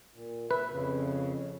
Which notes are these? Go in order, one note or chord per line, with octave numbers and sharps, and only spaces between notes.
A#2
B4 E5
F2 C#3